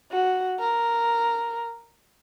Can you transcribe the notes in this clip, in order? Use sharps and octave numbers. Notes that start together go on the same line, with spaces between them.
F#4
A#4